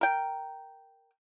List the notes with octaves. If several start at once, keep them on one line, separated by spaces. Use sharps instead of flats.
A#4 G5